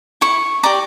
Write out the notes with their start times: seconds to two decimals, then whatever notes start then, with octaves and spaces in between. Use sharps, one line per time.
0.21 E4 C#6
0.63 G4 D5 A#5